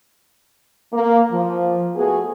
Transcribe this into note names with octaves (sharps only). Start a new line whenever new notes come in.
A#3
F3
A3 B3 F#4 G#4